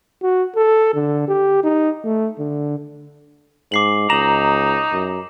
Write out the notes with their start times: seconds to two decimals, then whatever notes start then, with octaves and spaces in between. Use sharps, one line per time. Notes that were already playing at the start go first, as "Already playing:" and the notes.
0.23 F#4
0.56 A4
0.95 D3
1.28 G4
1.64 D#4
2.04 A3
2.39 D3
3.72 G#2 D6 C7 F#7
4.10 C#2 D#4 A#5 E7 F#7
4.92 F#2